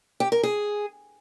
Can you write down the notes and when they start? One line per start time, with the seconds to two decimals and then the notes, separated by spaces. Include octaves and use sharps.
0.20 G4
0.32 A#4
0.43 G#4